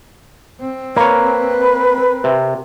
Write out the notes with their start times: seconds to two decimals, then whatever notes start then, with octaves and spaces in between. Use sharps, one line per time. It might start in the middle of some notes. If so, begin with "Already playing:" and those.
0.60 C4
0.96 A#3 A#4 B4 C#5
2.24 C3